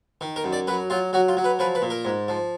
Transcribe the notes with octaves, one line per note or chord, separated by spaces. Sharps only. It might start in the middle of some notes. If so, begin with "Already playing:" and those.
D#3
A#4
F#2
D5
F#3 B4
F#3 F4
F#3 F#4
F4
F#3
B4
F3 B4
B4
A#2
A#4
G#2
F3